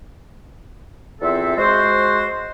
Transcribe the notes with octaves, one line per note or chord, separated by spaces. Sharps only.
E2 C4 F4 A4 E5
G#3 F#4 C5